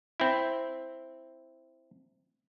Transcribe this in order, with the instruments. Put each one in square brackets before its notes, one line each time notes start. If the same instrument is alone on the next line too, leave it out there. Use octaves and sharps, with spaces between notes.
[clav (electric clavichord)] C4 E4